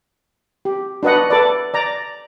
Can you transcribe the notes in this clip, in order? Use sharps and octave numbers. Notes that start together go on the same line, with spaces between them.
G4
D4 F#4 B4 D#5 F#5
A4 B4 D5
D5 A#5